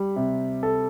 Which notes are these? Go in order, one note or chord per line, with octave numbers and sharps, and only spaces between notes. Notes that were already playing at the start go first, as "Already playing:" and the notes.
Already playing: G3
C3
A4